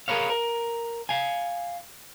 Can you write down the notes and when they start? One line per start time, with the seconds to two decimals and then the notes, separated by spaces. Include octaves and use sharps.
0.08 G#4 A#4 B4 C#5 F5
0.30 A#4
1.09 F5 G#5